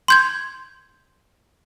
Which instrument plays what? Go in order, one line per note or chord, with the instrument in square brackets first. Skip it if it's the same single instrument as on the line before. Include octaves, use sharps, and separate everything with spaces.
[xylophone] C6 G6 G#6